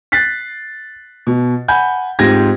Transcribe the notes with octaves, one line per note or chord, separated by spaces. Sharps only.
F#6 A6 B6 C7
B2
F#5 G#5 B5 G6
G#2 C4 F4 G4 G#6 A#6